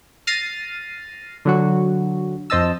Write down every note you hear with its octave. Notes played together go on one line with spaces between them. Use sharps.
F6 A6 A#6 C7 D#7
D3 F#3 F#4
F2 C5 D#5 A5 E6